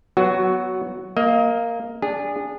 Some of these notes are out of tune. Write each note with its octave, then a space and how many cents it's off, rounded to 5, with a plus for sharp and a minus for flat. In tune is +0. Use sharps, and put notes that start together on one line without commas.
F#3 +15 B3 +0 F#4 +0
A#3 +0 D#5 +30
D4 -10 G#4 -25